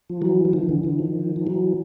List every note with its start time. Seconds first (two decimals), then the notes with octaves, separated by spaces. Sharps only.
0.10 F3
0.22 E3 F#3
0.45 F#3
0.53 D#3 F3
0.63 D#3
0.69 D3 E3
0.83 D3 E3
0.99 D#3 F3
1.36 F3
1.47 E3 F#3